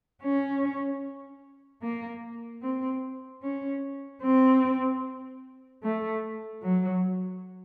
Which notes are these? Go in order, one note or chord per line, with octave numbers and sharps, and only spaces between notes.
C#4
A#3
C4
C#4
C4
A3
F#3